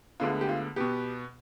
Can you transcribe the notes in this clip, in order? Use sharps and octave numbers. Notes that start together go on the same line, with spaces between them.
D2 D3 G#3 B3 F4
G4
F4
B2 B3 G4